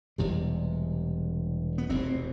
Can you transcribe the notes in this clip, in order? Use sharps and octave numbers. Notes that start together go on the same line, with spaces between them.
E1 E2 C3 G3
B3
F1 E2 B2 C4